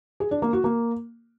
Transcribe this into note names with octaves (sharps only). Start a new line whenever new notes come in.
G#4
D4
A#3
F#4
A#3